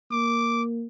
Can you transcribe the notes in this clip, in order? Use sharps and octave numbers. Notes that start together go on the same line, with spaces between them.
A#3 D6